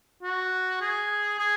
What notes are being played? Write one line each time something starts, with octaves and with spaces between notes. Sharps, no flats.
F#4
G#4
G#4